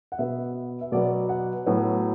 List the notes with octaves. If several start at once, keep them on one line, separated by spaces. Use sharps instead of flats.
F#5
B2 B3 E5
E5
B2 F#3 B3 D5
F#5
A2 F#3 B3